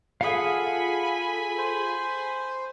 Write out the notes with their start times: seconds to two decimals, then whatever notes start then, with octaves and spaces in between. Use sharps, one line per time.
0.21 F4 G#4 A4 F5 F#5 G#5 B5 D#6
1.58 C5